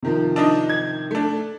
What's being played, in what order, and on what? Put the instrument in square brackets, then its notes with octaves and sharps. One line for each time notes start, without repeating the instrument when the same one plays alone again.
[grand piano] C3 D#3 F3
[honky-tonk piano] D4 D#4 D#5
G#6
A3 D4